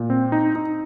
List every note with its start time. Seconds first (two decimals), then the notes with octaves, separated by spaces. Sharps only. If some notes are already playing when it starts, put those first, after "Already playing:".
Already playing: A#2
0.10 C4
0.32 D#4
0.56 D#4